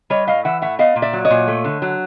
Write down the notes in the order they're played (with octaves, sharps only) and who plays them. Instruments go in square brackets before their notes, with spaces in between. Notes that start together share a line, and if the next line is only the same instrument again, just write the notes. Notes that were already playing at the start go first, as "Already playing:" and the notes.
[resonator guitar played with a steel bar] G3 C#5 D#5
A2 D#5 F5
E3 E5 F#5
A2 E5 F#5
B3 D#5 F5
A#2
D5 E5
F#3
C#5 D#5
A#2
A3
D3
F#3